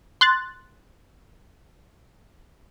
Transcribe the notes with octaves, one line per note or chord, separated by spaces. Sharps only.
C6 F#6 A6